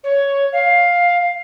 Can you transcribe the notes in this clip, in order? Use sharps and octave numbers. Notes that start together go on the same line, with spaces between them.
C#5
F5